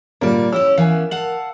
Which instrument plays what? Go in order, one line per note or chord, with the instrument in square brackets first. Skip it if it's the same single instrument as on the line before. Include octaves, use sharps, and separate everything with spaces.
[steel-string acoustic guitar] D2 D5 [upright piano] A#2 G3 A#3
[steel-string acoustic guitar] C#4 E4 G4 [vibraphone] C#5 [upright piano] E6
[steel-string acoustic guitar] E3 B3 C#4 [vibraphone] A#4 [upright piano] F5 G#5
[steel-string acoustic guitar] F5 F#5 A5 [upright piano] F#7